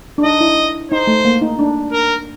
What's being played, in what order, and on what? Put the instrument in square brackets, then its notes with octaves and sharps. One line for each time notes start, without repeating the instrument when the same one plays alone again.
[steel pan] D4
[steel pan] D#4 [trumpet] D#5
[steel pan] E4
[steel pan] D#4 [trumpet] C5
[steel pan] A3
A#3
D#4
D4
[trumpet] A#4